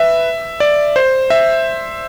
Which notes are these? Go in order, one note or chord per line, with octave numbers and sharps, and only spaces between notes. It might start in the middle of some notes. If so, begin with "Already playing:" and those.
Already playing: B4 E5
D5
C5
E5